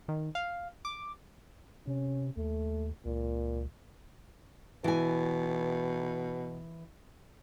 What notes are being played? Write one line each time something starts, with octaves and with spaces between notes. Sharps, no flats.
D#3
F5
D6
C3 C#4
D#2 A3
C#2 A#2
B2 E3 G#5